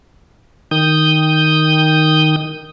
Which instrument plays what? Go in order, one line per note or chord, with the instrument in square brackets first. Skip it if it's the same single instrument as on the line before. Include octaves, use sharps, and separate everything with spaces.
[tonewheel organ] D#3 D#6 G6